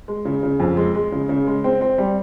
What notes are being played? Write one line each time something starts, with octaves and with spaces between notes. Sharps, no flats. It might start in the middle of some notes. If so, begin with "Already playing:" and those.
G#3
C#3
C#3
F2
G#3
G#3
C#3
C#3
G#3
C4
C4
G3